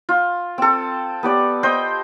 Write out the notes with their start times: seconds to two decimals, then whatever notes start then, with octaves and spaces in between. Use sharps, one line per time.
0.09 F4
0.58 C4 A4
1.23 B3 G4 D5
1.63 C5 D#5 G5